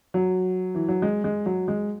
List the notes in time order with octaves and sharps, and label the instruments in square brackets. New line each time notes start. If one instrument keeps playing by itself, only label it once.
[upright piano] F#3
E3
F#3
G#3
G#3
F#3
G#3